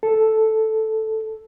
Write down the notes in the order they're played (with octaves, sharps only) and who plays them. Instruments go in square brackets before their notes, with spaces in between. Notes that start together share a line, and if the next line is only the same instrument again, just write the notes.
[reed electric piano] A4